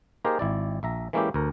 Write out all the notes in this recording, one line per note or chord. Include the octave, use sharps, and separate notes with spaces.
A#3 D#4 G4 G#4 A#4 C5
G#1 E4 D5
A#1 E5 A#5
E3 G#3 A#3 C#4 E4 G4
D2 A#4